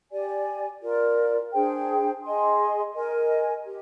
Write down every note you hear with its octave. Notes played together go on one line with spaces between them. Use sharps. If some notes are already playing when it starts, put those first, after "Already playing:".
G4 D5 G#5
F4 A#4 D5
D4 G#4 C5 G5
G#4 D#5 G#5 C6
A#4 D#5 G#5
G4